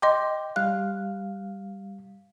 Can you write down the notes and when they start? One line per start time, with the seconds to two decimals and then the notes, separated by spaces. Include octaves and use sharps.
0.02 D#5 G5 C6 D6
0.56 G3 F5 F#6